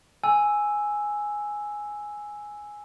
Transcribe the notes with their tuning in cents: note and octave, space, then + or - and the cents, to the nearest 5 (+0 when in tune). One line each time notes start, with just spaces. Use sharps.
G#5 +0 E6 +0